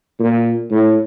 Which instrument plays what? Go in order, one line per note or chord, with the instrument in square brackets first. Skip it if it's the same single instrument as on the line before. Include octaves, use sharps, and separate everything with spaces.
[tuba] A#2
A2